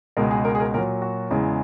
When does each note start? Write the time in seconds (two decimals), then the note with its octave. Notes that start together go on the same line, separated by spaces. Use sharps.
0.17 C#2 B2 G#3 A#4
0.31 G#4
0.45 A#4
0.55 G#4
0.60 A#4
0.74 A#2 F#3 A#4
1.02 F#4
1.31 E2 C#3 E3 G#3